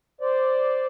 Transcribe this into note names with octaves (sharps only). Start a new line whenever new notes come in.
C5 D5